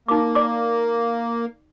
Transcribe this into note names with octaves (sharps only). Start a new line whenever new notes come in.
A#3 D#4 D6
D5 D6